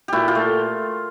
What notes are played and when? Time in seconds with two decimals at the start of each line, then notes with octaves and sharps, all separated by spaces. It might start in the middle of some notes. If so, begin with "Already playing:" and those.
0.08 A#2 E4 F#4 G4
0.28 F4 G4
0.35 A3